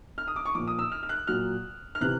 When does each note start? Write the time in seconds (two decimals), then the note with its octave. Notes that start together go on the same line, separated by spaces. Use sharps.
0.18 F6
0.28 D#6
0.36 D6
0.45 C#6
0.55 A#2 F3 D6
0.67 D#6
0.79 E6
0.92 F6
1.03 F6
1.09 F#6
1.27 A#2 F#3 F6
1.95 F6
2.01 C3 E3 F#6